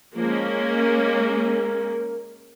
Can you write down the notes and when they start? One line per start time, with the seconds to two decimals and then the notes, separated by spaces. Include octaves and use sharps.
0.16 F3 G#3 A#3 C#4
0.70 A#4